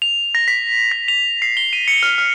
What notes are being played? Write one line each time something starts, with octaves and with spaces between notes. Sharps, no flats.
F7
A#6
B6
A#6
F7
C7
G7
D#7
C#7
F6
F6